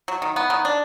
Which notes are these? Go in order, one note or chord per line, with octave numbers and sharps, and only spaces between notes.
F#3
D#3
B3
D#3
D4